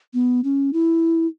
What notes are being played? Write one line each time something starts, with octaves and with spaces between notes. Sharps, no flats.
B3
C#4
E4